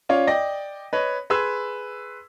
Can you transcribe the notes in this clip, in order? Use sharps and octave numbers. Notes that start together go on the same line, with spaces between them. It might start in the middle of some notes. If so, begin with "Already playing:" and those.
C#4 F4 C#5 D5 F5
D5 D#5 G5 A#6
B4 C#5 D#5
G#4 B4 C6 E6 G#6